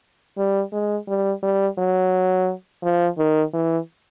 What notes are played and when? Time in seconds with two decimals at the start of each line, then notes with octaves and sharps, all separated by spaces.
0.38 G3
0.73 G#3
1.08 G3
1.43 G3
1.78 F#3
2.83 F3
3.18 D#3
3.53 E3